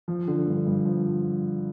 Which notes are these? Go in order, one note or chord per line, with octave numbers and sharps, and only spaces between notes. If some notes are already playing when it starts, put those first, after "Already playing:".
F3
D3
G2
G2
F3